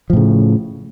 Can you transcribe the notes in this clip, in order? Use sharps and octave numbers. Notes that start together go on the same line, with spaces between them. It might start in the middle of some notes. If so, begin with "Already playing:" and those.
A2 C#3 F3